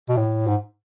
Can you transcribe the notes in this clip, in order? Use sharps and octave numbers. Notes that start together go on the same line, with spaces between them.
B2
A2
G#2